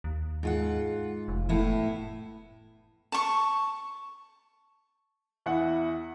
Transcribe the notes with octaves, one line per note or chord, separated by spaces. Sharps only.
D#2
G#2 F4 F#5
F1
A2 B3 E4
A5 C#6
E2 E4 F#5